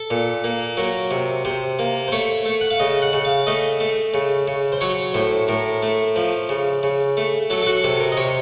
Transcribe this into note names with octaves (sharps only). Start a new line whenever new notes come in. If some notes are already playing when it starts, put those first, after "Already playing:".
Already playing: A4
A#2
A#3
F#3 A#4
C3
C3 C5
A#3
C5
A3 C#5
A3
F#5
F5
C#3 D#5
F#5
C#3
F5
A3 D#5
A3
C#3
C#3
C5
F#3 C#5
A2 C5
A2 A#4
A3
F3
C#3
C#3
A3
F#3 A4
A4
F#4
C3 A4
A#4
D#5
C3 C#5